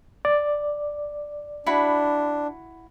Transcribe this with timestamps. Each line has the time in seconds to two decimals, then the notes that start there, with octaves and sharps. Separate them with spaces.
0.25 D5
1.66 D4 E4 F#4 B5